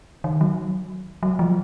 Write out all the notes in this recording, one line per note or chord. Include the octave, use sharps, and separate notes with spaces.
D#3
F#3
F#3
F3